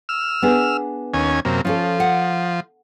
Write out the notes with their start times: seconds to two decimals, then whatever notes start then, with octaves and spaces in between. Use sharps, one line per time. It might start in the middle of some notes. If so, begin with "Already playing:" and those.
0.09 E6 F6
0.42 B3 D4 G#4
1.14 D#2 C#4 G#5
1.45 F#2 C3 A#3
1.65 F3 C#4 F4 A4
2.00 F#5